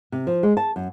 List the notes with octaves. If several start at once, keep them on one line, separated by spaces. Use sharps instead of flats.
C3
F3
G#3
A5
F#2